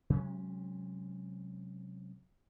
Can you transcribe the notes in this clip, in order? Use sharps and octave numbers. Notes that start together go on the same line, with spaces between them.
C3 F#3 G#3 C#4